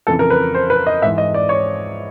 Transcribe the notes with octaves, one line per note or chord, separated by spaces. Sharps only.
F2 C#3 E3 A4
A#4
B4
C5
B4
D#5
G#2 E3 E5
D#5
D5
C#5